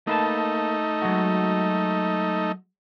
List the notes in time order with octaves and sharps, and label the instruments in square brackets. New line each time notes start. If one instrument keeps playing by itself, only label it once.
[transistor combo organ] A3 D#4 [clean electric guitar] A#3 B4 A5
[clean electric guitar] F#3 G#3 F#4